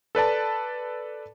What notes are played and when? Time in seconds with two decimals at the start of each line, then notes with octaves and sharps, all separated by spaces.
0.15 A4 B4 D5 A5